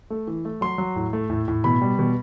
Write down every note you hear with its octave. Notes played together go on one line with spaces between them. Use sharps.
A3
E3
A3
F#3 C6
F#3
A2
A3
A2
A2
B2 B5
G3
B2